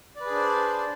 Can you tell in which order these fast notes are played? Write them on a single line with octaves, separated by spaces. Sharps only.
D5 B4 G#4 D4 C5